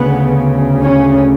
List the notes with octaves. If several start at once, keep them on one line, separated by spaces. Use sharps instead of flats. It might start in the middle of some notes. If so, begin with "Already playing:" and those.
Already playing: D2 C#3 B3
C#4